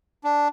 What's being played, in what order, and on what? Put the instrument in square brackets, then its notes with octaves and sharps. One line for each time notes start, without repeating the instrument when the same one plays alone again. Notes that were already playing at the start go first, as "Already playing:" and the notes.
[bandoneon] D4